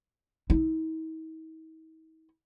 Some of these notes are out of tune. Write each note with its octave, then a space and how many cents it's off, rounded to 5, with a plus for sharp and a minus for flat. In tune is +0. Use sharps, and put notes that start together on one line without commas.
D#4 +45